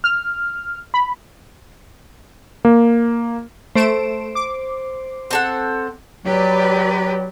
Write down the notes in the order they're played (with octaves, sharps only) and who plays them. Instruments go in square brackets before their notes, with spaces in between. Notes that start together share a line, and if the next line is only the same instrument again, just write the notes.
[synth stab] F6
B5
[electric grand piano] A#3
[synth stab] A3 D7 E7 [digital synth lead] C5
[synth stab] D6
[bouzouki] C4 A4 F#5
[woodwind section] F#3 [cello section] G4 B4 D5